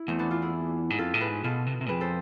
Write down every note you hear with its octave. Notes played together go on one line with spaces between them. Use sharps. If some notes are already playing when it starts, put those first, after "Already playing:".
Already playing: E4
E2 A3 C4
B3 D4
D4 F4
E4 G#4
G#2
F2 F4 A4
A2
G#4 B4
G#2
B2 F4 A4
C3
B2
C3
F2 G#4 B4
A4 C5